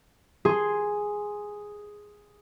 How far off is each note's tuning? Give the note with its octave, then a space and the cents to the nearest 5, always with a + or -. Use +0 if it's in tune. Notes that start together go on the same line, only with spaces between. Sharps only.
G#4 +0 C6 +0